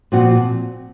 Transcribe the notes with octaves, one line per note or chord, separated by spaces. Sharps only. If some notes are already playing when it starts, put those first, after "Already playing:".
A#2 F3 C4 F#4